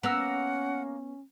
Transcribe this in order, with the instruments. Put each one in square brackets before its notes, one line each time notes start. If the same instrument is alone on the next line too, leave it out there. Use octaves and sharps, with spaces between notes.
[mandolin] A#3 A#4 E6 [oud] B3 [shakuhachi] C#4 [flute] F#5